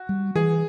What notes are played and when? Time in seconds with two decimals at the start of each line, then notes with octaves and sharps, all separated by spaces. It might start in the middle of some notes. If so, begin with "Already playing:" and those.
Already playing: F#4
0.09 G3
0.35 E3 G#4